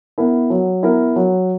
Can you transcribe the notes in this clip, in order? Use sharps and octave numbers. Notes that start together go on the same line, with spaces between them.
B3 E4 A#4
F#3
B3 E4 A#4
F#3